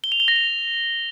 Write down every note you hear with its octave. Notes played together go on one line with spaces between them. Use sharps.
G7
F7
G7
A#6
F7